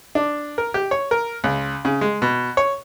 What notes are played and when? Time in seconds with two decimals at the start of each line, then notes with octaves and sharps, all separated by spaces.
0.15 D4
0.58 A#4
0.74 G4
0.91 C#5
1.11 A#4
1.44 C#2
1.85 C#3
2.01 G#3
2.22 B2
2.57 C#5